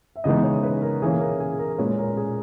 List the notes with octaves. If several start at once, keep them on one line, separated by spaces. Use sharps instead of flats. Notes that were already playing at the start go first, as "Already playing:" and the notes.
E5
C#3 E3 G#3 B3 D#4 D#5
C#5
B4
A#4
E3 A#3 C#4 G#4
A#4
G#4
A#4
A#2 G#3 C#4 B4
A#4
G#4